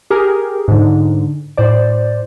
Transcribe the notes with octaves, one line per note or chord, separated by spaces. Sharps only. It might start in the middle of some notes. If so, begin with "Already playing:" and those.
G4 G#4 A#4
G#2 D3
A2 C5 D5